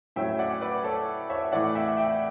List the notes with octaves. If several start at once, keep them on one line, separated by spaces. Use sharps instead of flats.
A2 F#3 C#4 E5 G5
D5 F#5
B4 D5
A4 C#5
C#5 E5
A2 E3 A3 D5 F#5
E5 G5
E5 G5